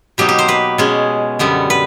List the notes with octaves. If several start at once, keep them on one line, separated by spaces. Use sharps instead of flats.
B2 F#3 A#3 D#4 G4
G4
C5
B4
B2 G#3 C#4
F#2 D3 G3 B3
B4